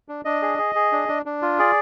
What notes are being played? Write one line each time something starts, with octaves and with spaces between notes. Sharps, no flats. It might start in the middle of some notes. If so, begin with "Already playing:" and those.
D4
D4 D#5
G#4
G#4
G#4
D4
D4
D4
F4
G#4 D5